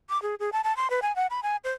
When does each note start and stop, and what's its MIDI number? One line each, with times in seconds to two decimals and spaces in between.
0.10 0.20 86
0.22 0.35 68
0.40 0.50 68
0.53 0.61 81
0.64 0.75 81
0.77 0.90 84
0.90 1.00 71
1.02 1.14 80
1.16 1.27 78
1.30 1.41 83
1.43 1.56 80
1.64 1.72 72